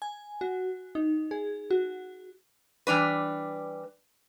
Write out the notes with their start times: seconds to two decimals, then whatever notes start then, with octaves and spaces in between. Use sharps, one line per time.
0.02 G#5
0.41 F#4
0.95 D#4
1.31 G#4
1.71 F#4
2.87 E3 G3 D4 B4